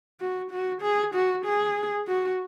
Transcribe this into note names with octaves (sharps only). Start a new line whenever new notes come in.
F#4
F#4
G#4
F#4
G#4
F#4